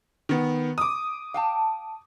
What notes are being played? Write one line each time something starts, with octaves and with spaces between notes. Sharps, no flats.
D#3 B3
D6 D#6
F5 G5 A5